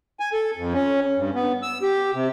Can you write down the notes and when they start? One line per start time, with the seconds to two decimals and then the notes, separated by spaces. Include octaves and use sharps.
0.20 G#5
0.33 A4
0.57 F2
0.74 C#4
1.17 G2
1.35 B3
1.63 E6
1.82 G4
2.14 C3